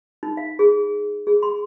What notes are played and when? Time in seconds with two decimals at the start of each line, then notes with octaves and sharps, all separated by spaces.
0.23 D#4
0.37 F5
0.59 G#4
1.27 G#4
1.43 C6